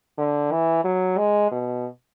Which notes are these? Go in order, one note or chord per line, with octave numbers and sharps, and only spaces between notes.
D3
E3
F#3
G#3
B2